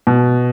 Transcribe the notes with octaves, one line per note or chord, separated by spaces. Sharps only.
B2